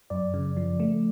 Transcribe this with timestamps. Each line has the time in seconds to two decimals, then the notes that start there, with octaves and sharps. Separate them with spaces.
0.10 F#2 D5
0.34 C#3
0.57 F3
0.80 A3